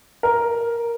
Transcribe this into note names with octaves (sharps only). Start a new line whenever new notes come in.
A#4